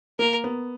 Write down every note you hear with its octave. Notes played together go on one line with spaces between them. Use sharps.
A#3 A#4
B3